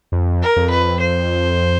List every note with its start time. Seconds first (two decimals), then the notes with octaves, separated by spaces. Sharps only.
0.12 F2
0.42 A#4
0.56 F2
0.70 B4
1.00 C5